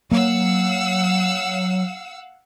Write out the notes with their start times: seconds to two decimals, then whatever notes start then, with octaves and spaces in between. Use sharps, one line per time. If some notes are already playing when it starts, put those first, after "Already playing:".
0.12 F#3 A#3 F5 F#5 E6